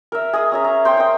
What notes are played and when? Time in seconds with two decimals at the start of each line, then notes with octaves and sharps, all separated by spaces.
0.12 A#4 E5
0.33 G#4 D#5 D#6
0.52 C#4 E5 A#5
0.64 A#5
0.85 C5 G5 C6 C#6
0.97 D#5 G5